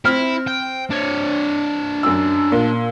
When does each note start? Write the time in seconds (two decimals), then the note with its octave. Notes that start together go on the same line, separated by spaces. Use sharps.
0.05 C4 E4 F6
0.47 G5
0.90 D4 C#5
2.03 F#2 E6
2.52 A#2